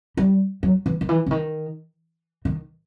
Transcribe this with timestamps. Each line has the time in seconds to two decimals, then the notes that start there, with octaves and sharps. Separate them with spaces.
0.17 G3
0.63 F#3
0.86 E3
1.01 D#3
1.09 E3
1.26 D3
1.31 D#3
2.45 D#3